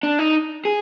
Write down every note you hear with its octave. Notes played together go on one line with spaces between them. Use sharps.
D4
D#4
G#4